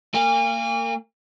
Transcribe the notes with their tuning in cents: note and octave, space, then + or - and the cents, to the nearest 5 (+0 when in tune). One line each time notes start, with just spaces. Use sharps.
A#3 -30 G#5 -35